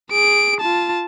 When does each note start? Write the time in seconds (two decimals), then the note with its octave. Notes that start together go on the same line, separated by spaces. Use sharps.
0.11 G#4 D7
0.60 F4 A5